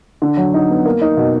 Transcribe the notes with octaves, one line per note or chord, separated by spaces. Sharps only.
D3
F#3
D#4
B3
A#3
D#4
B2